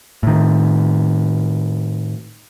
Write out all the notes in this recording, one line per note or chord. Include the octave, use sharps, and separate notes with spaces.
A2 D#3